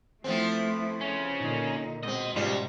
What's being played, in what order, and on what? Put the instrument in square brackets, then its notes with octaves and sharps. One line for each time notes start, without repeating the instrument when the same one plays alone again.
[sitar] F3 B3 C4 [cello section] A3 E4
[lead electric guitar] C#3 C#4
[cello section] A#2 D3 D#4
[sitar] B2 C4 [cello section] G#3 [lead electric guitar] D#5
[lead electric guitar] C#2 [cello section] G#2 B2 [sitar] G3 F4